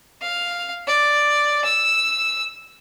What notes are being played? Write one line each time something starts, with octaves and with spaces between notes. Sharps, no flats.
F5
D5
E6